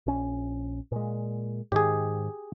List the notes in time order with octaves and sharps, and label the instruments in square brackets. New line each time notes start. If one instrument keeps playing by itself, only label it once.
[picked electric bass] A#1 C#4
A#2 G#3
[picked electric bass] G#2 D#3 [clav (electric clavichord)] G4 G#4